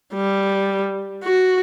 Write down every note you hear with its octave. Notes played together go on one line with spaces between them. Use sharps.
G3
F#4